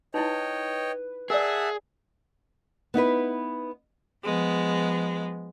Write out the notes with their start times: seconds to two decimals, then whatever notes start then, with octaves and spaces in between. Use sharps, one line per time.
0.14 D#4 E4 B4 C#5 D#5 G5
1.30 G#4 A#4 D5 E5 F#5 A5
2.94 B3 D#4 E4 B4
4.23 F3 G#3 B3